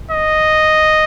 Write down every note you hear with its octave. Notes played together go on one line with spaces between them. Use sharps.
D#5